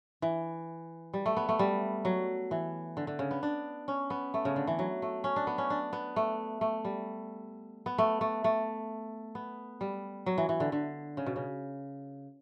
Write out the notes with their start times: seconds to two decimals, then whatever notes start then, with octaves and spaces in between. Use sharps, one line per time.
0.22 E3
1.13 G3
1.26 A3
1.37 B3
1.49 A3
1.59 G3
2.05 F#3
2.51 E3
2.97 D3
3.07 D3
3.19 C#3
3.31 B3
3.43 D4
3.88 C#4
4.10 B3
4.34 A3
4.45 C#3
4.56 D3
4.67 E3
4.79 F#3
5.02 A3
5.24 C#4
5.36 D4
5.47 B3
5.58 C#4
5.70 D4
5.93 B3
6.16 A3
6.61 A3
6.85 G3
7.86 B3
7.98 A3
8.21 A3
8.44 A3
9.35 B3
9.81 G3
10.26 F#3
10.38 E3
10.49 E3
10.60 D3
10.72 D3
11.17 C#3
11.26 B2
11.36 C#3